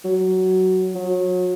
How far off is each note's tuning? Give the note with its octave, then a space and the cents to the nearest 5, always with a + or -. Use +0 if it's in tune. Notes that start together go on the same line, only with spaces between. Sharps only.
F#3 +10
F#3 -30